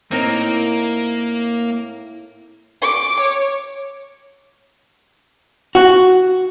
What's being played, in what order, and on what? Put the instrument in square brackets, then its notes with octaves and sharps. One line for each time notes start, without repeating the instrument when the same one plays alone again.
[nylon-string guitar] A2 [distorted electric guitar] A#3 [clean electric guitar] C4 D#4 A#4
[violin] D6
C#5
[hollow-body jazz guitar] F#4